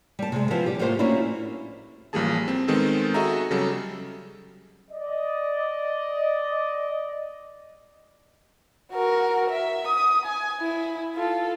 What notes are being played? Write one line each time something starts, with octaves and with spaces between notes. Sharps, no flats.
G3 A5
C3 G#3
F3 B3 E4 G4 C5 A5
G3 G4
A2 G3 A3 A#3 F4 C5
A3 A#3 C#4 D4 E4 F#4
A1 F3 G3 A#3 G#4 A5
C4
D#3 G#3 B3 C4 A4
F#4 G#4 A4 D#5 E5 A#5
C#3 F#3 G3 A4
D5 D#5
F#4 A#4
E5
D#6
G#5
E4
F4 A4